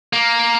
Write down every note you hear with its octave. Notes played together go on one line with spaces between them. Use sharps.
A#3